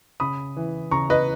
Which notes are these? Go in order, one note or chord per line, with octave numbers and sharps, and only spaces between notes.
C#3 B5 D#6
E3
C#3 A#5 C#6
B4 D#5